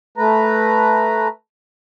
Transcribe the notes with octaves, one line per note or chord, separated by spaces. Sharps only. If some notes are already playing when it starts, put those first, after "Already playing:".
A3 B4 A#5